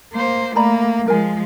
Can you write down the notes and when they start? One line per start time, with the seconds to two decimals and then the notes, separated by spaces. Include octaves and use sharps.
0.13 A#3 C5
0.56 A3 A#3 D5 A#5 B5
1.08 F3 G#3 A#4 G#5